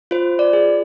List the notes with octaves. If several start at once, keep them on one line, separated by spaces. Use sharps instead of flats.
F4 C5
D5
G#4